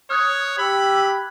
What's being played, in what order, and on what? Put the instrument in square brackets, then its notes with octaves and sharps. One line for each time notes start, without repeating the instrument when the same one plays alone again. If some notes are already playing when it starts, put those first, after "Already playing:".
[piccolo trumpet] C#5 [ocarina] D#6 [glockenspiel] F6 F#6 G#6
[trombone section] G4 [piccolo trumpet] B5 [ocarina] E6